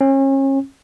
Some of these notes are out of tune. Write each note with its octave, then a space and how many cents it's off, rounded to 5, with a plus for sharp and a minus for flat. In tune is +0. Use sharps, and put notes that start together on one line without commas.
C#4 -35